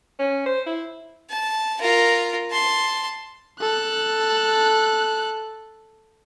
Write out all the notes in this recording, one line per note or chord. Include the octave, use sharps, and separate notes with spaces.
C#4
C5
E4
A5
F4 A#4
A5 C6
A4 F#6